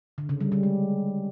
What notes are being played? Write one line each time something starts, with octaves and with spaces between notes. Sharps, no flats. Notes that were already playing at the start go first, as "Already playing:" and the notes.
D3
C#3
G3
G3
G#3